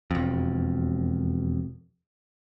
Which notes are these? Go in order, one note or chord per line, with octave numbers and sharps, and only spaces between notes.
E1 F2